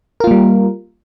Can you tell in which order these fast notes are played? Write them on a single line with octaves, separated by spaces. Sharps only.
A#4 F4 A#3 G3